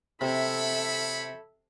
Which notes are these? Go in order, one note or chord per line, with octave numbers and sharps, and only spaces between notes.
C3 C4 A4 C#5 E5 B5